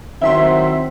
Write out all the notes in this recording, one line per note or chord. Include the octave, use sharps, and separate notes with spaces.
D#3 F#3 C4 E4 E5 C6